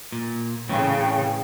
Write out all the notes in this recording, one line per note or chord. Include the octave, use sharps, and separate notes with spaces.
A#2
A2 C#3 E3 G5